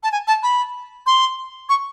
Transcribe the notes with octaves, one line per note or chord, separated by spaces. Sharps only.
A5
G#5
A5
B5
C6
C#6